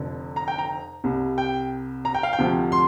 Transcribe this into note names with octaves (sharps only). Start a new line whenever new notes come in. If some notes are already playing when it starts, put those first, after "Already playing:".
Already playing: F1 F2 D3
A#5
G5
A#5
C2 C3 G3
G5
A#5
G5
F5
G5
D2 C3 F3
C6